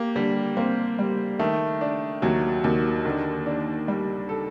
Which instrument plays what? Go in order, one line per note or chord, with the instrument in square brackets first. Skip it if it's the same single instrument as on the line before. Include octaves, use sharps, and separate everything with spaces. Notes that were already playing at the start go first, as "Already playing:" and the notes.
Already playing: [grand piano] A#3 [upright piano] G4
[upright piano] D3 [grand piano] G3
[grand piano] A#3 [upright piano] C4
[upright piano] G3
[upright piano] D#3 [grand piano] A3
[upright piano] D4
[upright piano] D#2 [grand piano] F#3
[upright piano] D#2
[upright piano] D3 [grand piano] D#3
[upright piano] D4
G3
A4